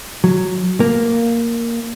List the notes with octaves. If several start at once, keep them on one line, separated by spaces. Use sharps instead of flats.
F#3
A#3